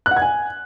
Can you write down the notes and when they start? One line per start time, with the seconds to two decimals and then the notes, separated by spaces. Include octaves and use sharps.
0.06 F#6
0.11 F#5
0.17 G#6
0.22 G#5